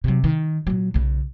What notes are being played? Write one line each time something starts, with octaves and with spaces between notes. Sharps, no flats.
C3 F#3
D#3
A#2 F#3
B1 C#3